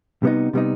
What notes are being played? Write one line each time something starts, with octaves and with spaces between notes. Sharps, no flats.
C3 G3 B3 D#4
C3 G3 B3 D#4